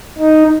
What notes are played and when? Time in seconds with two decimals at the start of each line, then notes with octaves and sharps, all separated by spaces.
0.18 D#4